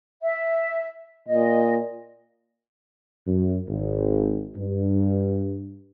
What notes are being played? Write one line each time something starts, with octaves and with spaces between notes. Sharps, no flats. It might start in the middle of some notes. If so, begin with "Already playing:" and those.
E5
A#2 D#5
F#2
G#1
G2